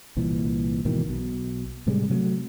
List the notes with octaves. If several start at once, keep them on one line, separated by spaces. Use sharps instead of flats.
C2 A#2 E3
G#2 B2 D#3 E3
B1 B2
A2 C3 G3 G#3
C3 F#3 A3